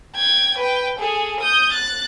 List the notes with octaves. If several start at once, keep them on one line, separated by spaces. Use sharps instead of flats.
G5 G#6
B4 G5
G#4 A4
D#6 G6
F#6 A6